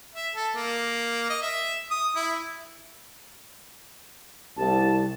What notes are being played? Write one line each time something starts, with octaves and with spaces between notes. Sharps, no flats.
E5
A4
A#3
D#5
E5
D#6
E4
C2 A5